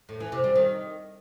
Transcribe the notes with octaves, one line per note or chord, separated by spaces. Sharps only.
A2
E3
C3
G3
D#3